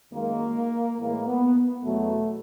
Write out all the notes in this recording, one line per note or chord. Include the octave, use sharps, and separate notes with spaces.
F#2 D#3 G#3 A#3
A2 E3 G#3 A#3
B3
E2 B2 F#3 A3